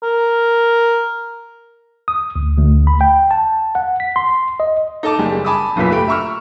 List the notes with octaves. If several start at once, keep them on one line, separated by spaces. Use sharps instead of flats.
A#4
D#6
D2
D2
B5
G5
A5
F#5
B6
C6
D#5
D#4 A4 A5 D6
F#1 G3 G#4
G#5 A5 B5 D6 D#6
F#1 B1 F#2 A#2 B4 B6
A3 G4 B5 D7
E5 A#5 C#6 E6 F6